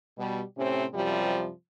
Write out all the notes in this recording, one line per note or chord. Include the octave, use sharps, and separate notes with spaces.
B2 G3
A2 C3 C4 C#4
F#2 C3 F3 G3